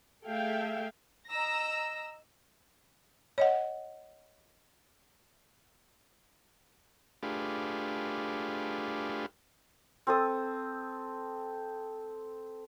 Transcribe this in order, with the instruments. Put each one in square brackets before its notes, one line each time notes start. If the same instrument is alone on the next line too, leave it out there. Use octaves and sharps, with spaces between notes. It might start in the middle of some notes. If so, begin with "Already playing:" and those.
[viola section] A3 G#4 A4 E5 F5 G5
[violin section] D#5 A#5 E6 A#6
[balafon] C#5 D#5 F#5
[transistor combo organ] A3 D4 F4 G4 G#4 B4
[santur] C4 A4 D#6